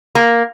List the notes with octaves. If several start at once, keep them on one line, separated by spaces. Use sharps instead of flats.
A#3